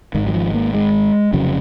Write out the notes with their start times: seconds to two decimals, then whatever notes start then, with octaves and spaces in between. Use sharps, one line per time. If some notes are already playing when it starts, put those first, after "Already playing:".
0.14 G#1 G#2 D#3
0.27 F#3
0.34 F3
0.54 A#3
0.74 G#3
1.33 F1 F2 C#3 F#3